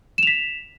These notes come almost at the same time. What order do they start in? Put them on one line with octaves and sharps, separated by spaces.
E7 F7 B6